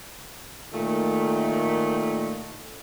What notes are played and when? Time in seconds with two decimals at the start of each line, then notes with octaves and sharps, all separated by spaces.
0.73 A#2 D#3 A3